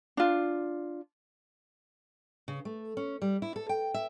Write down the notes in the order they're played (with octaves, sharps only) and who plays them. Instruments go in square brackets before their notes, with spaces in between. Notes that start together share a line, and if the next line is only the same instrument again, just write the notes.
[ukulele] D4 F4
[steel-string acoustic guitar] C#3
A3
C#4
G3
E4
A4
G5
E5